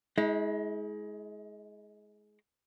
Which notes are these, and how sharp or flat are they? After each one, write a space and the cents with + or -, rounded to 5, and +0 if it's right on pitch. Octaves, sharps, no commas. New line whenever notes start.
G#3 +20 E4 -35